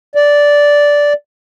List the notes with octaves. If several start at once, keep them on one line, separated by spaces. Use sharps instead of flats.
D5